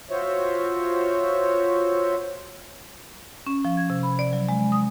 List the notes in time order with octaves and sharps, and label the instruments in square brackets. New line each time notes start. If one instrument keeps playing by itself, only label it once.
[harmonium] F4 F#4 C5 C#5 E5
[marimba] C#4
F3
G#6
C3
B5
D5
F#3
G#3
D#6